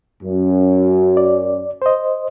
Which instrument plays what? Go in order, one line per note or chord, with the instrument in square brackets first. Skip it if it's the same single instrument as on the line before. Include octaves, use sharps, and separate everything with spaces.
[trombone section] F#2
[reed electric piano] D5
C5 D#5